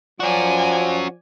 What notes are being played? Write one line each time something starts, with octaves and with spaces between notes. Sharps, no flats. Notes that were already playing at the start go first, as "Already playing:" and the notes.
F3 C#4 F#4 D5 G#5